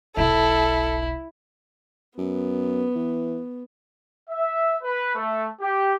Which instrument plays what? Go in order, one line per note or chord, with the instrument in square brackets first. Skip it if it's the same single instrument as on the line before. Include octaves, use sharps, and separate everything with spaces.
[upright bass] E1 B1 [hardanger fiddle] E4 [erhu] A4
[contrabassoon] F#2 [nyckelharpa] B3
[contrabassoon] E3
[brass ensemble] E5
B4
A3
G4